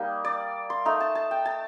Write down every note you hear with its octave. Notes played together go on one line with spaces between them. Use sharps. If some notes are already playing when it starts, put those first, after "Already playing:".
Already playing: G3 A#3 D#4
D5
C6
A3 D#4 A#5
A5
A5
G5
A5